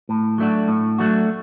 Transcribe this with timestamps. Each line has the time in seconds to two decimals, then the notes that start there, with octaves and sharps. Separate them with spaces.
0.09 A2
0.38 F#3 A3 D4 F#4
0.68 A2
0.98 F#3 A3 D4 F#4